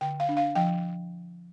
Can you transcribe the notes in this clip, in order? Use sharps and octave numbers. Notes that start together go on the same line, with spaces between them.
D3 G5
F5
D4
F5
F3 G5